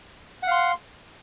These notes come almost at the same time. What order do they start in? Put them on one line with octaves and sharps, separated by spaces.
F#5 F5 C6